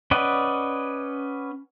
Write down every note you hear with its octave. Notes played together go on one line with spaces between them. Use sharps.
C#4 B4 D5 D#5 F#5